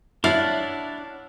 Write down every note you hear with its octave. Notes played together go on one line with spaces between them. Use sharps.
D4 E4 C#5 D5 F5 F#5 A5